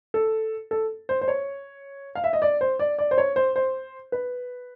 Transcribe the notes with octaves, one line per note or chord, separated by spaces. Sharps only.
A4
A4
C5
C5
C#5
F5
E5
D#5
D5
C5
D5
D5
C5
C#5
C5
C5
B4